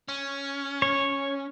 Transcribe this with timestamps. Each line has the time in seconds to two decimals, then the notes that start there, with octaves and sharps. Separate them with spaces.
0.08 C#4
0.82 C#5